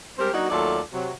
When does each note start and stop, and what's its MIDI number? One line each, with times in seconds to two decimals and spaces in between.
0.18 0.32 55
0.18 0.32 56
0.18 0.32 60
0.18 0.32 67
0.18 0.32 70
0.18 0.32 72
0.33 0.49 54
0.33 0.49 58
0.33 0.49 62
0.33 0.49 63
0.33 0.49 66
0.50 0.80 39
0.50 0.80 54
0.50 0.80 57
0.50 0.80 65
0.50 0.80 69
0.50 0.80 74
0.93 1.13 48
0.93 1.13 54